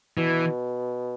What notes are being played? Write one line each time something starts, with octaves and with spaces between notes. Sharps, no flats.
B2 E3